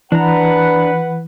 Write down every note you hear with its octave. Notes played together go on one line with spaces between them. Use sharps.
E3 D4 B4 F#5 A#5